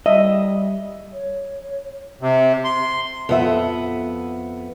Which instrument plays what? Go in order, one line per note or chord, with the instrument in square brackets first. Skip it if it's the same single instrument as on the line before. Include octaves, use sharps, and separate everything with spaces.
[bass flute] G3 [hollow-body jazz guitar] D#5 [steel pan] E5
[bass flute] C#5
[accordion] C3
C6
[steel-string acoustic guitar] F2 B3 E5